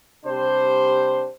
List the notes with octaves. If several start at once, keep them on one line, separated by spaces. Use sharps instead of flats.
C3 G3 D4 G4 C5